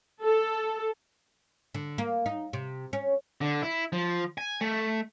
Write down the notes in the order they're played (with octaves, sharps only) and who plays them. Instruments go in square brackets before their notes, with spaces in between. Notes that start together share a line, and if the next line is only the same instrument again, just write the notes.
[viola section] A4
[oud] D3
A#3
D#4
C3
C#4
[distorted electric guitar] D3
E4
F3
G#5
A3